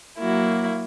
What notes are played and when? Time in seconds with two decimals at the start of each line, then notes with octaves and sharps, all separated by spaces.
0.19 F#3 A#3 E4 F#4